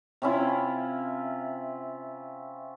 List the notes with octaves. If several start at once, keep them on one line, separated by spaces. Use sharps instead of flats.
C3 C#4 E4 F4